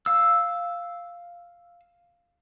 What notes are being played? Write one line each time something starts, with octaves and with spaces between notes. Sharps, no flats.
F5 E6